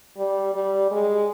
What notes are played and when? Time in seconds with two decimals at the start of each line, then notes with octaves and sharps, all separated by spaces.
0.17 G3
0.54 G3
0.91 G#3